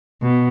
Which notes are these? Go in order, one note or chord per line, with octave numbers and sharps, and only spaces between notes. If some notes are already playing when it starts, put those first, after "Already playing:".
B2